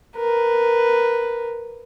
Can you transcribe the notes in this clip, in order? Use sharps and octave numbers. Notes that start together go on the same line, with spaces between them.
A#4 B4